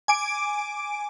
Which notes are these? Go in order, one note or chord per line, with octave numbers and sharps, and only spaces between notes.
G#5 D6 D7